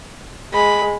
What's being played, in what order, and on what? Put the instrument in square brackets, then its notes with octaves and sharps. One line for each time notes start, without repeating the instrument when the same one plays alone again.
[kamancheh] G#3 [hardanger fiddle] B5